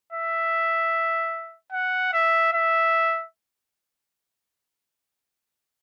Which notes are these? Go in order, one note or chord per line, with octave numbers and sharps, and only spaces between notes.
E5
F#5
E5
E5